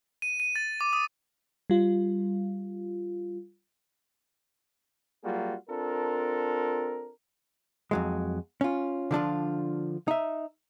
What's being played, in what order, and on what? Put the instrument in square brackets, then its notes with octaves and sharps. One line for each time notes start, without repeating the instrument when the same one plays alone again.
[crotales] D#7
D#7
A6
D6
D#6
[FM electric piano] G3 F4
[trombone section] F#3 G3 A#3 F4 F#4 G#4
C4 D4 F4 A4 A#4
[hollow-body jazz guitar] F2 F#3 G#3
C#4 F4
D3 F3 D4 F4
D#4 E5